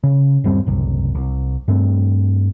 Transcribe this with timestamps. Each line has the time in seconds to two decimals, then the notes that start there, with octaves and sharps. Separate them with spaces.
0.03 C#3
0.44 D#1 G2 G3 C4
0.67 F#1 C2
1.15 C2
1.68 G2 A3 C4